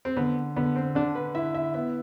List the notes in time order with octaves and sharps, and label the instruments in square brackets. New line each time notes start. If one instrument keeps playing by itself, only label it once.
[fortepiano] C4
[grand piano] D3 [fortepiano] B3
[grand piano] D3 [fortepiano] B3
[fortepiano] C4
[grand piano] D3 [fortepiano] D4
[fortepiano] B4
[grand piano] E4 [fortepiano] E5
[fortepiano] E5
[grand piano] B3 [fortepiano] E5